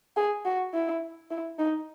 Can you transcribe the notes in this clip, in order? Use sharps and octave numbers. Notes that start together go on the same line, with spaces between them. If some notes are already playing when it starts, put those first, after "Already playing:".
G#4
F#4
E4
E4
D#4